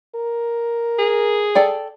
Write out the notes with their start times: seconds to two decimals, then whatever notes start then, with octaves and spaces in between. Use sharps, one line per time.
0.15 A#4
0.98 G#4
1.55 A4 D5 G5